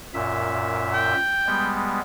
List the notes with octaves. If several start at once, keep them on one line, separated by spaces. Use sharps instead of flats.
F#2 A#2 E5
G5
G3 G#3 B3